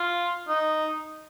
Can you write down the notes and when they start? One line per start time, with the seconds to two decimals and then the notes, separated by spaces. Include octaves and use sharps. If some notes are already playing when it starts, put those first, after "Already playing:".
Already playing: F4
0.48 D#4